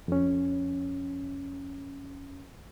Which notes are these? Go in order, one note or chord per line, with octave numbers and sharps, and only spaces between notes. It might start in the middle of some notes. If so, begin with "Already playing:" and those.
F2 C#4